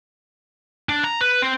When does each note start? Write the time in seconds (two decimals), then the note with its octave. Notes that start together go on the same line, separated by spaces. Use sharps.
0.89 D4
1.04 A#5
1.21 B4
1.42 C4